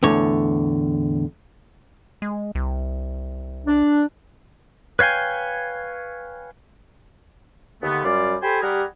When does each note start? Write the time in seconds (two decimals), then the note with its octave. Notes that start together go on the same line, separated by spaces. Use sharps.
0.03 E2 A2 D3 C#5
2.22 G#3
2.55 C2
3.66 D4
4.99 B4 C#5 F5 G5 G#5
7.82 D#2 D3 A3 B3
8.04 F#2 G3 F4 D5
8.42 G4 A4 C5 G#5 B5
8.61 G3 G4 G#4 A#4 F#5